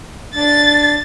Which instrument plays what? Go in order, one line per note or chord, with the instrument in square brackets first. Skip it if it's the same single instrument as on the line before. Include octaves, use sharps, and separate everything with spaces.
[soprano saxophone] D4 [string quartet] A6